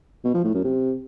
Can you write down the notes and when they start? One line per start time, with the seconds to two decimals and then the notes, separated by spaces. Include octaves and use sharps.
0.24 B2
0.34 F3
0.44 A2
0.54 F#2
0.64 C3